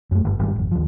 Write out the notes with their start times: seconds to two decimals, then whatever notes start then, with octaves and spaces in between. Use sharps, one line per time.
0.11 F#2 A3
0.25 G1
0.39 G#1 G#2 G3
0.56 G#1 F2
0.72 D#2 F3